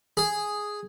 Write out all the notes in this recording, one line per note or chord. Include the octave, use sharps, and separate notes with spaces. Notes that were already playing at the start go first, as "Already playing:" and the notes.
G#4